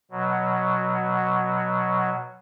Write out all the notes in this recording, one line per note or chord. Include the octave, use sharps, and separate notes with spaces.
B2 F#3